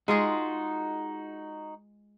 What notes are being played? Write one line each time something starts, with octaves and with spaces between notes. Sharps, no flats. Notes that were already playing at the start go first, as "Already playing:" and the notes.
G#3 D#4 F4 F#4 G#4